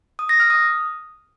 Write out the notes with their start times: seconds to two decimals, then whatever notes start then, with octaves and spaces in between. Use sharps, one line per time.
0.19 D#6
0.29 A#6
0.40 F6
0.50 D#6